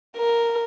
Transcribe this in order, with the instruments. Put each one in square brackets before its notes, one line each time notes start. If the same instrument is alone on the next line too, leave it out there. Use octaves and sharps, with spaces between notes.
[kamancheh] A#4